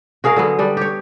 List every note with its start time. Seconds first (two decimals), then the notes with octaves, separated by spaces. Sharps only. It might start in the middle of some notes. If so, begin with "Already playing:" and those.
0.24 F#4 G#4 A#4 F5
0.36 D3 F#3 B3
0.59 G3 B3 D4
0.77 G4 C#5